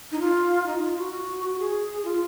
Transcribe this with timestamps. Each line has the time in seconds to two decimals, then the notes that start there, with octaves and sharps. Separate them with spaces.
0.12 D#4
0.20 F4
0.66 D#4
0.82 F4
0.97 F#4
1.59 G#4
2.05 F4